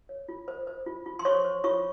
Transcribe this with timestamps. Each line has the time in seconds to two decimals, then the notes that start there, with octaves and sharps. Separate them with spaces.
0.09 C#5
0.29 F4
0.48 C5
0.67 C5
0.86 F4
1.06 F4
1.19 C6
1.25 C5 C#5 C#6
1.45 C5
1.64 F4 C#5 C#6